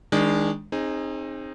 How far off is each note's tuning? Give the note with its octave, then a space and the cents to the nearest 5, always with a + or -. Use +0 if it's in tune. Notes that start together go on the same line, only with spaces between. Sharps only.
D#3 +25 G#3 -15 D4 +0
C4 +30 D#4 -5 G#4 -5